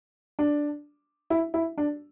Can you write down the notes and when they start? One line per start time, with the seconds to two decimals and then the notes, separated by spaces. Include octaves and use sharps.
0.39 D4
1.30 E4
1.54 E4
1.78 D4